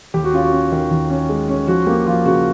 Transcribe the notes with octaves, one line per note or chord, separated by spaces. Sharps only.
D#2 G4
F#4
C#4 F4
F#4
C#4
D#3
D#2
C#4
G#3
C#4
F3 F#4
A#3 G4
F3 F4
C#3 F#4